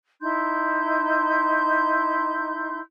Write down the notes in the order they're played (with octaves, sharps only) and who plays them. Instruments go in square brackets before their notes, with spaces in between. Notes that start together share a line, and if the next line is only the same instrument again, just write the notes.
[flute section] D#4 E4 C6 G6